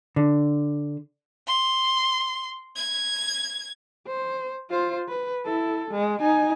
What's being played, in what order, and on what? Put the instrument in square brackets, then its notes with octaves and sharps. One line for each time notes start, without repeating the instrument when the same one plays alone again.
[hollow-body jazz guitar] D3
[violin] C6
G#6
[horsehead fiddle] C5
F4 C5
B4
E4 A4
G#3
D#4 G#5